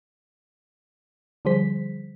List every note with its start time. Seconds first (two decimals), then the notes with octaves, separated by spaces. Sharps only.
1.45 D3 F3 G3 G#4 C5 B6